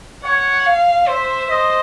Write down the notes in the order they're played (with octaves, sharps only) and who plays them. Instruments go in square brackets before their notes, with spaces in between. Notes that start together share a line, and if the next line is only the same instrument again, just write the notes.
[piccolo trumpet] C#5 [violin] F#5
[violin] F5
[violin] C5 [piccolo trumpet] E5
[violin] C5 [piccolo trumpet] D#5